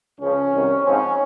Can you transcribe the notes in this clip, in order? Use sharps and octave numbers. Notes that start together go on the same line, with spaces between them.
C#2 C#3 F3 C#4
C2 C3 D#3
G#2 F3 C4 C#4